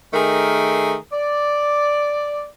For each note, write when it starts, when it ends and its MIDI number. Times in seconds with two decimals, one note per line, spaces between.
0.13 0.95 51
0.13 0.95 57
0.13 0.95 68
0.13 0.95 70
1.12 2.45 74